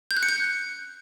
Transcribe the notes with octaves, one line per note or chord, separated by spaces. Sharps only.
G6
F#6
C#7
G6